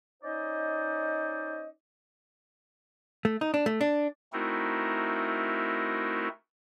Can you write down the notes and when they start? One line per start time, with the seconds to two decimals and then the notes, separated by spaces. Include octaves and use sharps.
0.23 C#4 D#4 C5 D5 D#5
3.25 A3
3.41 D#4
3.54 D4
3.66 A3
3.81 D4
4.33 A3 C4 D#4 E4 F#4 A#4